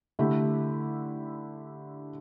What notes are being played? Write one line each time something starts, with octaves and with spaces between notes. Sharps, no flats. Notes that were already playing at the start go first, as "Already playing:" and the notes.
D3 A3 E4 G4